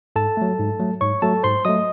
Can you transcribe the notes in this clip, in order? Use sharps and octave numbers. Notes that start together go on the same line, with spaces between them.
G#2 A4 A5
F#3 A3
G#2
F#3 A3
G#2 C#5 C#6
F#3 A3 A4 A5
G#2 C5 C6
F#3 A3 D#5 D#6